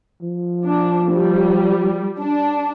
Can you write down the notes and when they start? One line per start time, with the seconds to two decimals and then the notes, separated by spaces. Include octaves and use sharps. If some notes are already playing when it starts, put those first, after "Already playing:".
0.22 F3
0.65 D4
1.12 G3
2.19 D4